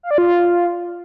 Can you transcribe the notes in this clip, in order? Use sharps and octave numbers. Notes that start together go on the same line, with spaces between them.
F5
D5
F4